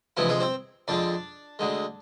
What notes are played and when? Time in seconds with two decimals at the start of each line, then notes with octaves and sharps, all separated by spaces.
0.17 D2 C3 E3 F3 G#3 E4
0.29 G#3 G#4
0.40 C4 C5
0.88 F2 D3 G#3 D4 D5
1.59 D2 D3 G#3